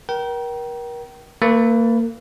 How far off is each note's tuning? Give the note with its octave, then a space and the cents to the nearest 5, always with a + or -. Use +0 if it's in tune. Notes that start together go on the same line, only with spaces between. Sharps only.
A#4 +35 G5 -30
A#3 -30 B4 +0